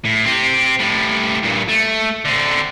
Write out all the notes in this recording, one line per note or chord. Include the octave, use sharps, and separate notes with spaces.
A2
C4 G4
A2 G3
G2 A#2
A3
D3 C4